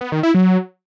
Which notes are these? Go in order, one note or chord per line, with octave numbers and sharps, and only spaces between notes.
B3
D#3
E4
F#3